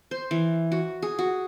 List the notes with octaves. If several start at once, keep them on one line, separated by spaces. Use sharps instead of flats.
C5
E3
F#4
G#4
F#4